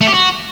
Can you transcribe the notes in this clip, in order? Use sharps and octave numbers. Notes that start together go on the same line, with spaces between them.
A3
G4
F#4